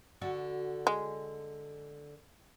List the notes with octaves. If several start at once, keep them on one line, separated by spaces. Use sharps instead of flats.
D3 F#4 A4
G#3